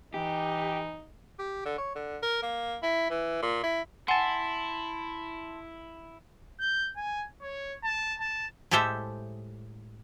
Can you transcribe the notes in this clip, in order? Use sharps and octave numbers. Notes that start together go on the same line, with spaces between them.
E3 D#4 G4
G4
D3
C#5
D3
A#4
A#3
E4
E3
A#2
E4
E4 F#5 G#5 A5 C6
G6
G#5
C#5
A5
A5
A2 G#3 G4 A4 C5 E5